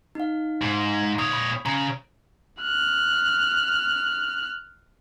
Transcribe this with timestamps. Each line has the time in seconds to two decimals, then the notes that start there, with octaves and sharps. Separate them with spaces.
0.15 D#4 F5
0.62 G#2
1.19 A#2 C#5 D#6
1.33 B5
1.66 C#3 A#5
2.61 F6 F#6